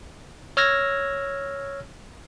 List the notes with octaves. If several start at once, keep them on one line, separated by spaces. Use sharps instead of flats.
C#5 E6 F6 G#6 A#6